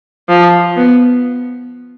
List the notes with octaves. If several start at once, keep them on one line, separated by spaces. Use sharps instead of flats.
F3
B3